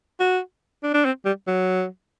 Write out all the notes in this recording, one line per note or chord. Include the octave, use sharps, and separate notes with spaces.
F#4
D4
D4
C4
G3
F#3